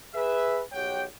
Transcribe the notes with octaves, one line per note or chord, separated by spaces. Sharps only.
G#4 B4 E5
B1 G4 C#5 F#5 G5